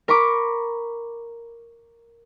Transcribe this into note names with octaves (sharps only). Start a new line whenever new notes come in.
A#4 A#5 B5 C#6 D6